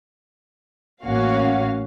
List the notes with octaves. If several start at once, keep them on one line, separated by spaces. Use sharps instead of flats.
A1 A#3 C#4 F#4 F5